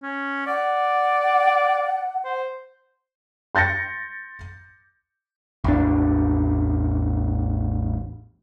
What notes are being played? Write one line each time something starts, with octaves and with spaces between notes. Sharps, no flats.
C#4
D5 F#5
C5
C6 G6 A6 A#6 C#7
A1 E2 D4